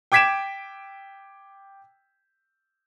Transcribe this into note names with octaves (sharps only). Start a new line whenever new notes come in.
G5 D6 G#6 B6 D7 E7